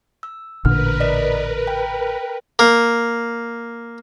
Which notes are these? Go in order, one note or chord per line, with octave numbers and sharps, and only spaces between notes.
E6
A1 A#2 D3 A#4 B4 F6
D5 D#5 B6
G5
A#3